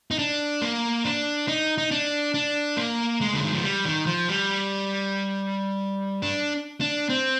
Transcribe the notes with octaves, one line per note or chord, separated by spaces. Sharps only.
D#4
D4
A#3
D4
D#4
D#4
D4
D4
A#3
G#3
D3
D#3
F3
G3
D#3
F3
G3
D4
D4
C4